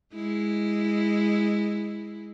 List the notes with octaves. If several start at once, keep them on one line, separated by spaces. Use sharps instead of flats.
G#3 E4